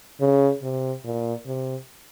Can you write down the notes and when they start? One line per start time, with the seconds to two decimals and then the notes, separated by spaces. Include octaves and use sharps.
0.21 C#3
0.62 C3
1.05 A#2
1.46 C3